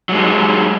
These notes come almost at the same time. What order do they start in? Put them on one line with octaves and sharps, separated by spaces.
F#3 G#3 D#4